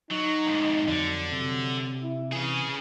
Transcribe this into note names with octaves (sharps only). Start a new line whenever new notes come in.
F#3 D#4
F2 G#2
F2 D3 F#3
C3 F#3
E4
C#3 E3 G#4